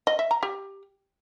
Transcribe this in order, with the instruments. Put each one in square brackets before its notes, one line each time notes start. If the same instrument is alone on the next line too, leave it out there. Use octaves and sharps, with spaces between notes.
[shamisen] D#5
E5
A#5
G4